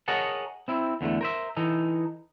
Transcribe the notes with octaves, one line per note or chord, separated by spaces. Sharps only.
G#4 A#4 C#5 D#5 F#5 A5
C4 E4
E2 D3 F3 A3
A#4 C5 E5
E3 D#4 A4